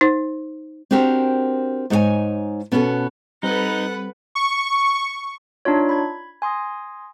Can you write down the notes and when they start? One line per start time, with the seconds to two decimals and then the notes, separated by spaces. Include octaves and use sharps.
0.01 D#4 C5
0.91 C4 D4 F#4 G4 A#4 C5
1.90 G#2 D#4 F#4 A#4 C#5 G#5
2.72 B2 B3 C#4 F4 F#4 A4
3.43 G3 C4 D#4 A4 B4 F#5
4.35 C#6
5.65 D4 D#4 F4 C#5
5.89 B5 G#6
6.42 G#5 C6 D#6 A#6